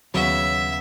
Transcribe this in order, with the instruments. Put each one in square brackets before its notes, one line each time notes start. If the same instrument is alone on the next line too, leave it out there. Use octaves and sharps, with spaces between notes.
[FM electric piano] D#2 [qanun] C#3 B3 C#4 [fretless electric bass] F#3 [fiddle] E5